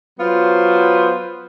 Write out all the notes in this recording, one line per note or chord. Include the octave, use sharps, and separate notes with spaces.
F#3 B3 F4 C5